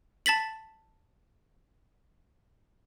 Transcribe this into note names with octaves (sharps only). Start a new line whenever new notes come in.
A5 A6 B6 F#7